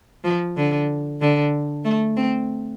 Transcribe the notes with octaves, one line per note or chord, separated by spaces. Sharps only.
F3
D3
D3
A3
C4